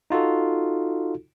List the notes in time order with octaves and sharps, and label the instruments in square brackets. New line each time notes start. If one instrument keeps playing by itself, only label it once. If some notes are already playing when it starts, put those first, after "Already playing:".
[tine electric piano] D#4 F4 F#4 A4